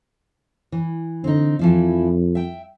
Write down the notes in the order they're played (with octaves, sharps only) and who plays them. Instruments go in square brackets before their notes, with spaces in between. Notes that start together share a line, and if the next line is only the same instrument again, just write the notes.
[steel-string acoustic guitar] E3
[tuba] D3 [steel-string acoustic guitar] C4 D#4
[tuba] F2 [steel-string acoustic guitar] E3 F3 E4
[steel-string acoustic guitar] E5 G5